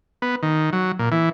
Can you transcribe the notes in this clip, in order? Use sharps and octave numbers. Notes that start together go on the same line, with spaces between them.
B3
D#3
F#3
A#2
E3